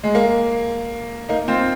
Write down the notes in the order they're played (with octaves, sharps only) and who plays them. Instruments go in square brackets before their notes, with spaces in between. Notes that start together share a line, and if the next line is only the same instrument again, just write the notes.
[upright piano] G#3
A#3
A#3 D#4
C4 F4